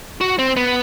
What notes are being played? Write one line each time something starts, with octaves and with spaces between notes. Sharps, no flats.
F#4
C4
B3